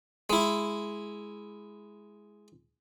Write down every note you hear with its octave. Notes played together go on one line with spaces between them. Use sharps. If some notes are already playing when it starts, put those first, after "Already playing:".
G#3 E4